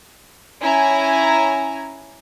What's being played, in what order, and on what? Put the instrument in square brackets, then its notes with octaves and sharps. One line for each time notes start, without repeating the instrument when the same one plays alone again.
[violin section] C#4 E4 G#5 A#5